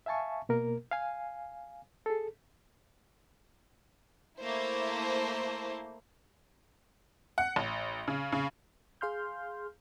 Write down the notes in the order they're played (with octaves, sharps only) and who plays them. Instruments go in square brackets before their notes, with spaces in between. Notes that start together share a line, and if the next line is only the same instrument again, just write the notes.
[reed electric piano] E5 F5 G#5 A5 C#6
B2 A#3 A#4
F5 G#5
G#4 A4
[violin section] A3 A#3 E4 C5
[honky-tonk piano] F#5
A1
C#3
C#3
[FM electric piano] G#4 F5 C6 F6 G6